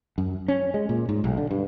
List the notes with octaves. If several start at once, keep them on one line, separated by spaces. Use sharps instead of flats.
F#2
C#4
G#3
A#2
G#2
B1
D3
G2